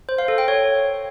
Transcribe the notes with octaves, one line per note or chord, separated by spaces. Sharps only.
C5
F5
A4
G5
C#5